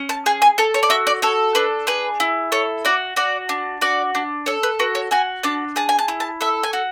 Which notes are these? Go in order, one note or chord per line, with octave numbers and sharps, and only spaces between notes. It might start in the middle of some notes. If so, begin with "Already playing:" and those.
Already playing: C#4
A5
G#4 G#5
G#5
A4 C#5
C#5
D5
F#4 E5
D5
A4 C#5
D4 B4
G#4 B4
E4
A4 C#5
F#4 D5
F#4 D5
D4
F#4 D5
D4
A4 C#5
B4
F#4 B4
C#5
F#4 G#5
D4 A5
G#4 A5
G#5
A5
E4
A5
A4 E5
G#5
F#4